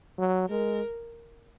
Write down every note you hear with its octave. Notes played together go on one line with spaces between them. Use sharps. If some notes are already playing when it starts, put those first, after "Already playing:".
F#3
G#3 A#4